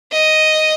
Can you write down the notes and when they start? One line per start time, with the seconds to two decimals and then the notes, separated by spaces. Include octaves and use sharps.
0.12 D#5